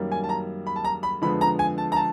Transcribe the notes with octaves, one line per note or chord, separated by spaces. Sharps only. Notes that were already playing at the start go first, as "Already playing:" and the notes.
Already playing: F#2 D#3 G3 A#3
G#5
A5
A#5
B5
A5
A#5
B5
F2 D3 F3 G#3 B3 B5
A#5
G#5
A5
A#5
A5